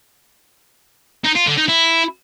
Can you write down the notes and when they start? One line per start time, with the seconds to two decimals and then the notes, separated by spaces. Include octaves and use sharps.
1.24 D#4
1.35 F4
1.46 D3
1.57 D#4
1.68 E4